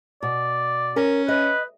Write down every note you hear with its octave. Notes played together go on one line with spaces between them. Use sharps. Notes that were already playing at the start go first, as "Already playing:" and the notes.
B2 D5
C#4 A#4
B4 D#5